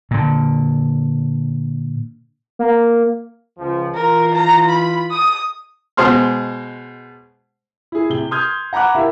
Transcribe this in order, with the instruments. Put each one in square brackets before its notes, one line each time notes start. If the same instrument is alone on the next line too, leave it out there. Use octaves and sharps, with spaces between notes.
[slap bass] A#2 D3
[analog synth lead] A#3
[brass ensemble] C#2 F3
[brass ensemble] E3 F4 [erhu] A#4
[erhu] A#5
B5
D#6
[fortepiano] B2 G#3 C5 C6 F6
[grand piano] E4 G#4
C3 G7
C6 D#6 F6 G6 G#6
F#5 A#5 B5 D6 F#6
E4 G4 A#4 E5 F5